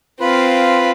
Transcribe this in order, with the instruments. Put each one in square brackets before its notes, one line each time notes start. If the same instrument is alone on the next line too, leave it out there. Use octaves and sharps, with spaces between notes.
[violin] C4 F5 [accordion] F4 B4 B5